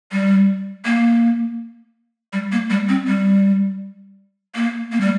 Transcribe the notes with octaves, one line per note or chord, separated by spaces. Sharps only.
G3
A#3
G3
A#3
G3
C4
G3
A#3
A#3
G3